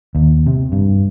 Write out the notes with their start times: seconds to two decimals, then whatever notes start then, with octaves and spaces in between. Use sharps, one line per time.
0.15 D#2
0.46 C3
0.72 G2